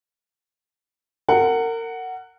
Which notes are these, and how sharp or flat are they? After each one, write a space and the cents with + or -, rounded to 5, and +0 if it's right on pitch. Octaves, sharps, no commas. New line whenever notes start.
A#4 -30 F#5 +5